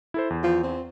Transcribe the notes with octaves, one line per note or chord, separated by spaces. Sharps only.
E4 A4 C5
E2
F3
C4